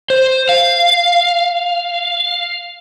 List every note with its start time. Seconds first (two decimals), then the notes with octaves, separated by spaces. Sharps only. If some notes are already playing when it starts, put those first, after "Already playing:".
0.10 C5
0.49 F5